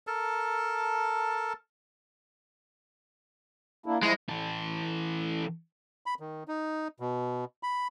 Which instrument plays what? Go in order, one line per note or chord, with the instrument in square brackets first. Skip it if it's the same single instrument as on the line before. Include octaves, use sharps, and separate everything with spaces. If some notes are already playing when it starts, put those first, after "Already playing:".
[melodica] A4 A#4 A5
[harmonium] A#3 D4 E4
[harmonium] F3 E4 [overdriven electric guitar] G#3
[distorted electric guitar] E3 A4
[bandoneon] B5
D#3
D#4
B2
B5